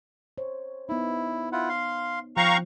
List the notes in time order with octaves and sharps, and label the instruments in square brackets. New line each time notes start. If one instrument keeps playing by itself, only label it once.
[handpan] C5 C#5
[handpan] B3 D#4 [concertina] E4
[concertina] E4 F4 F#5
F5 C6
[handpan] F3 [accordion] F5 A#5 C#6 [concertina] G5 F#6